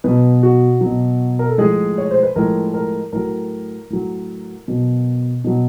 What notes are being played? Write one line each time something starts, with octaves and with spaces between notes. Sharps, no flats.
B2 F#3 B4
F#4
B2 F#3
A#4
A4
A2 F3 G#3 G#4
C#5
C5
B4
A2 F3 G#3 A#4
A#4
A2 F#3 A#4
A2 F#3
B2 F#3
B2 F#3